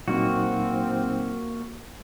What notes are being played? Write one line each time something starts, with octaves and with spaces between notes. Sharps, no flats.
A#2 F#3 A#3 C4 D#4 F#4